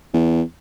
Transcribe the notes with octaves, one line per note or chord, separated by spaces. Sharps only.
E2